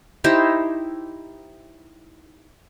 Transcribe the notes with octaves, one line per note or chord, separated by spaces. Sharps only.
D#4 E4 G4 C5